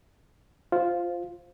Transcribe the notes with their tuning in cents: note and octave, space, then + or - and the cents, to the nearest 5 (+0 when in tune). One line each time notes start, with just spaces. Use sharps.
F4 +0 C5 +0